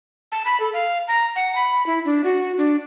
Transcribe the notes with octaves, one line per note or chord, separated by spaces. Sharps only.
A5
B5
A4
F5
A#5
F#5
B5
E4
D4
F#4
D4